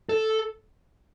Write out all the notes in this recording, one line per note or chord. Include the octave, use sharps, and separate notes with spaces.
A4